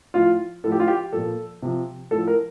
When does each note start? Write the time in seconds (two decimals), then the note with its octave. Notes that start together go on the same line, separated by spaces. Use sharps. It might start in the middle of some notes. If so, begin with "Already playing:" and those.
0.14 A2 F3 F4
0.64 A2 F3 A4
0.72 G4
0.80 F4
0.88 G4
1.13 A#2 F3 A4
1.62 C3 F3
2.11 A2 F3 A4
2.27 A#4